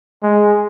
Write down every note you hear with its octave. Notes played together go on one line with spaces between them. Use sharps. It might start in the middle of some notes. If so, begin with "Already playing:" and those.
G#3